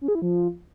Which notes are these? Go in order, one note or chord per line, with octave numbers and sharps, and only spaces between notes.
C#4
G#4
E4
F3